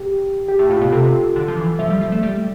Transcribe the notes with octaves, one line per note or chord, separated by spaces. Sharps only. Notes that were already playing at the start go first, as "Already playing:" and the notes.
Already playing: G4
G4
A2
A2 F4
B2
C3 A4
D3
F3
E3
F3 E5
G3
F3
A3
G3